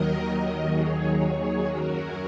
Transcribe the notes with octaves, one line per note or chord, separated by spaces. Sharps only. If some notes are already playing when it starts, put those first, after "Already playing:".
Already playing: D#2 D#3 F#3 A#4 D#5
A#4 D#5
D#2 D#3 F#3 G#4 C#5
G#4
F#2 F#3 F#4 A#4